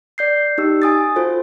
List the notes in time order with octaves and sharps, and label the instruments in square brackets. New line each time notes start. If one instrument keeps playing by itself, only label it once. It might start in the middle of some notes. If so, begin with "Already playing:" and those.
[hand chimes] D5 G6 C7
D#4 G4 E6
G#5 D#6 A6
F4 F#4 A4 C5